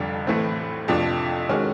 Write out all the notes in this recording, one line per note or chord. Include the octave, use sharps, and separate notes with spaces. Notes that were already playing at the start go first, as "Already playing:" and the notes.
Already playing: F1 F2 D3 G3
A2 E3 A3 C4
F2 C3 F3 A3 D4
D#3 G#3 C#4 F#4